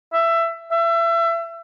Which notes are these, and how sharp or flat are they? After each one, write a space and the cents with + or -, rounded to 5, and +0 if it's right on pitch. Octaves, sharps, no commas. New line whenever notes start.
E5 +15
E5 +30